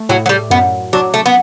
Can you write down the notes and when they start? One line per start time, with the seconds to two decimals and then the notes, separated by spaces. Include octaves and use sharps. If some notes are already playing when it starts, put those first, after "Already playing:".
Already playing: A3
0.09 A2 F#3
0.26 F#3
0.29 G3
0.50 F#2 B3
0.93 F#3 D4
1.14 A3
1.26 B3